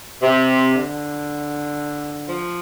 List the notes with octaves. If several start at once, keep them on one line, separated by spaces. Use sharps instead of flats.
C3
D3
F3